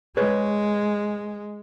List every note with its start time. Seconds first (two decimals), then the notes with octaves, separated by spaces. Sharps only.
0.17 G#3 G#4 B4 C#5